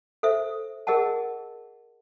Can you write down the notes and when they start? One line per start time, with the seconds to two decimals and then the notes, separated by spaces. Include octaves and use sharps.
0.23 A4 C5 E5
0.87 G#4 A#4 D#5 F#5 A5